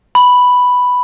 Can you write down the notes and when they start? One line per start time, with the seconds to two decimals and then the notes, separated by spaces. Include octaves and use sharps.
0.15 B5